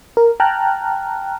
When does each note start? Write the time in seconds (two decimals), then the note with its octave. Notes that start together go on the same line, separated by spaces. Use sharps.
0.17 A#4
0.40 G5 A5 A#5 F6 F#6